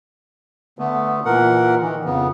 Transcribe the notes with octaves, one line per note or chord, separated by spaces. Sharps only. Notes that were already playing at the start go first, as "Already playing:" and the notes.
D3 A3 B3
A#2 E3 A#4 F#5
D#3 E3
F2 C#3 B3